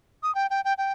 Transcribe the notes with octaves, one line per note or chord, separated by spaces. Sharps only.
D#6
G5
G5
G5
G5